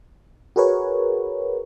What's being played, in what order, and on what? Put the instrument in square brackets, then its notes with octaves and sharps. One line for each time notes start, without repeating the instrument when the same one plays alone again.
[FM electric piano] F#4 G#4 A#4 B4 C#5